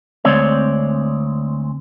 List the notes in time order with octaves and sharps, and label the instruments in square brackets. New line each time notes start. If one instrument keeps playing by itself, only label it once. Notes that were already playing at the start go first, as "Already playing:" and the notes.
[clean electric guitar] D2 G#3 C4 C#5 D5